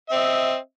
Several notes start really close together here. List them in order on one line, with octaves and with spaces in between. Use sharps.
E5 C4 D#5